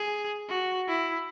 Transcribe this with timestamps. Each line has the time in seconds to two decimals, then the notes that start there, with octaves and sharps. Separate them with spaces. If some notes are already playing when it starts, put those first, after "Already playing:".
Already playing: G#4
0.49 F#4
0.88 E4